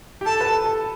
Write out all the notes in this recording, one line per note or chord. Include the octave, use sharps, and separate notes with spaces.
G4
A4 A5
B4
A4
A4